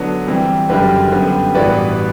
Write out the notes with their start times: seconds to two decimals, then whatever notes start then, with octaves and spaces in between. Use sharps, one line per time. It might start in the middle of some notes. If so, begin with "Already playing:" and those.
Already playing: D3 F#3 B3 D4
0.27 C3 E3 G3 C4
0.69 F#1 F#2 D3 G3 G4 B4
1.12 F#2 D3 G3 B3
1.55 A1 G2 E3 B3 F#4 B4 D5